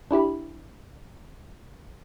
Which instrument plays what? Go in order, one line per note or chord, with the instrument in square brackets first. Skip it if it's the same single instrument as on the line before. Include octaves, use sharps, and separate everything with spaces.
[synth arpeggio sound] D4 E4 G4 B5